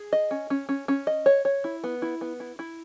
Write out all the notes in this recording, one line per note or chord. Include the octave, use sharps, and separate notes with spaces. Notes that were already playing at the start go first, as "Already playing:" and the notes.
Already playing: G#4
D#5
C#4
C#4
C#4
C#4
D#5
C#5
C#5
E4
B3
E4
B3
E4
E4